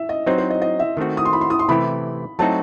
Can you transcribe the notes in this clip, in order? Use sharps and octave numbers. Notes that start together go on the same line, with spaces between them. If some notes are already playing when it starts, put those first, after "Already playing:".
Already playing: E5
D#5
F#3 C4 D#4 C5
C5
D#5
D#5
E5
D#3 A3 C4 F#4
D#6
C6
B5
C6
D#6
C6
C3 E3 A3 E4 G4 B5
F#3 A3 C4 D#4 F#4 A5